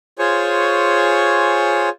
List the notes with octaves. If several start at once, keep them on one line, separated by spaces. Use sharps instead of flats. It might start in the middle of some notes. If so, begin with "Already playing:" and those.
F4 G#4 C5 C#5 G#5 C#6